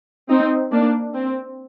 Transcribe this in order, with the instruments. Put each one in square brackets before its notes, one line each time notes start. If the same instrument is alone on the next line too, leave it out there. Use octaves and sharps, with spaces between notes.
[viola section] C4 D#4
A#3 D4
C4